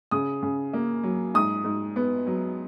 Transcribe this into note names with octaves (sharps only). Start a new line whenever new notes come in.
C#3 D#6
C#3
A#3
F#3
G#2 D#6
G#2
B3
F#3